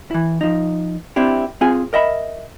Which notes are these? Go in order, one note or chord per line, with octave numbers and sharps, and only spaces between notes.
E3 E4
F3 D#4
C4 D4 E4 G4
C4 F4 G#4 G#5
A#4 D#5 E5 B5